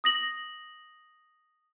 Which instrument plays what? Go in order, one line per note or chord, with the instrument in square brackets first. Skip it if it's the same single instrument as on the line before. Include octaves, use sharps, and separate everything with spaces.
[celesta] D#6 A#6 F#7